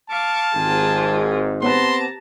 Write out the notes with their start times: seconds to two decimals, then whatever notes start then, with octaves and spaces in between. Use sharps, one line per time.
0.10 F5 A5 C#6 D6
0.55 G#1 G#2 F4 G4 G#4
1.62 B3 C4 G4 B4 A5 A#5 C6